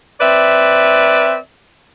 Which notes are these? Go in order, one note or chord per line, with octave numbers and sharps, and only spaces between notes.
C4 B4 D5 E5